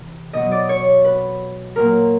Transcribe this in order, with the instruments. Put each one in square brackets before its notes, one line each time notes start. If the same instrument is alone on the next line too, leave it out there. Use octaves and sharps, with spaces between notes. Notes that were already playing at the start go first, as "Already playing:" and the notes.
Already playing: [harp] C3 E3
B2 F#3 D#5
D5
C#5
B4
A#2 F#3 A#4